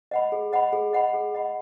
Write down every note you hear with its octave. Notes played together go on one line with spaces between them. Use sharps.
D#5 F#5 B5
G#4
D#5 F#5 B5
G#4
D#5 F#5 B5
G#4
D#5 F#5 B5